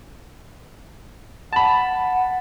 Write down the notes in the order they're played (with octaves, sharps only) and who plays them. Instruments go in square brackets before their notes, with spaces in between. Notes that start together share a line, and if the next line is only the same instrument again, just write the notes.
[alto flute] F#5 [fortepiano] A5 B5